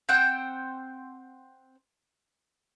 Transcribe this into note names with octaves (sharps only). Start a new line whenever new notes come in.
C4 C5 F#5 G5